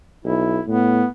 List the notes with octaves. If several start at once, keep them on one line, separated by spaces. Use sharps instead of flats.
B1 E4
A2 B3